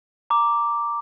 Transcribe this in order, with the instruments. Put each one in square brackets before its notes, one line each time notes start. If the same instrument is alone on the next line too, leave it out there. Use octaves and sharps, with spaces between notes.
[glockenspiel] A#5 D6